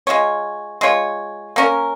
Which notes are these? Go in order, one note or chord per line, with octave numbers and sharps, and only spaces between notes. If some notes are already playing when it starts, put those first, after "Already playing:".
G#3 F4 C#5
G#3 F4 C#5
A#3 C#4 A#4 C#5